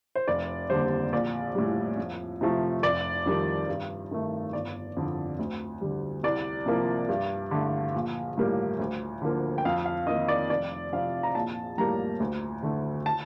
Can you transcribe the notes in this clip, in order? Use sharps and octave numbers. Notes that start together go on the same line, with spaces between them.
C5
F1 D5
D#2 D3 G3 C5
A#1 D5
A2 G3
F2
C3 F3 A3
F1 D5
F2 D#3 G3
G2
D#3 A3
G1 D5
F2 D3
D2
D3 G3
C2 D5
C3 F3 A#3
G2
D3 A3
A#1
A2 G3 A#3
D2
D3 F3 A#3
G5
F2 F5
F5
D#3 A#3 D#5
D5
F1 D5
F2 C3 F5
A#5
A#1 A5
A2 G3 A#3 A#5
D2
D3 A3
A5